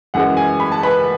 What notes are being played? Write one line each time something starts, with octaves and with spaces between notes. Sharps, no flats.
F#2 E3 G#3 F#5
G#5
B5
A5
B4 B5